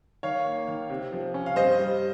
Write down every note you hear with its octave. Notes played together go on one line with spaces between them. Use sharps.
D#3 C#5 F5
A#3
D#3
C3
F3
C#4
F5
G2 C5 D#5
G3